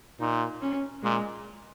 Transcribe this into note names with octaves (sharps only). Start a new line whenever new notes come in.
A#2 D#4
C#4
A#2 G#3